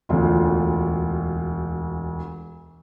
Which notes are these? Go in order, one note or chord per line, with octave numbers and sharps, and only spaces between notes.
E1 D2 F4